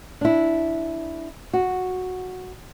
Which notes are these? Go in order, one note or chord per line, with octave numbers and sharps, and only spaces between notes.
D4 E4
F#4